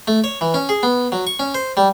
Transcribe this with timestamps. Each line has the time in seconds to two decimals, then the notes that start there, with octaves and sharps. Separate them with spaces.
0.08 A3
0.24 C#5
0.41 E3
0.54 C#4
0.69 G#4
0.83 B3
1.12 F#3
1.27 C#6
1.39 C#4
1.54 C5
1.77 G3